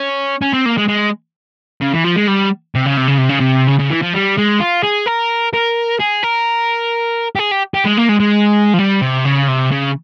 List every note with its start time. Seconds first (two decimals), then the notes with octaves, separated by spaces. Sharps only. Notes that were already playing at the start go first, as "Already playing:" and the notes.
Already playing: C#4
0.42 C#4
0.53 C4
0.66 A#3
0.78 G#3
0.88 G#3
1.81 C#3
1.94 E3
2.04 F3
2.16 G#3
2.27 G3
2.75 C3
2.86 C#3
2.97 C3
3.08 C#3
3.18 C3
3.29 C#3
3.41 C3
3.68 C#3
3.79 C#3
3.90 E3
4.02 F3
4.14 G3
4.37 G#3
4.60 F4
4.83 G#4
5.06 A#4
5.54 A#4
5.99 G#4
6.23 A#4
7.35 G4
7.39 G#4
7.51 G4
7.74 G4
7.85 G#3
7.97 A#3
8.09 G#3
8.20 G#3
8.74 F3
8.79 G3
9.01 C3
9.25 C#3
9.48 C3
9.72 C#3